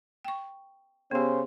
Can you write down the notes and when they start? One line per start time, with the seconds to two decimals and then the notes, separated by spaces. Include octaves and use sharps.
0.25 G5 C#6
1.11 C#3 B3 C#4 G4 C5